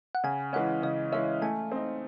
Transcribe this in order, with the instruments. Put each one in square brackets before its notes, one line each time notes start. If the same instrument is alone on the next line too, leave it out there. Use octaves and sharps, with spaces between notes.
[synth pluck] F#5
[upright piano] C#3 [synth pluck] G#5
[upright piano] E3 G#3 C#4 [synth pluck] F#5
[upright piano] C#3 [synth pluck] D#5
[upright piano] E3 G#3 C#4 [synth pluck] E5
[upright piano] A3 [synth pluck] G#5
[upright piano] C4 D#4